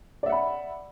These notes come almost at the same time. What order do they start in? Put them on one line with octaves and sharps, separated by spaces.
D5 E5 F#5 B5